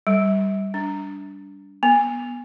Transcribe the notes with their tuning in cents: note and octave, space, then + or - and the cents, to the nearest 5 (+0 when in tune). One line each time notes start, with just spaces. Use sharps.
G3 +0
D4 -25
B3 -20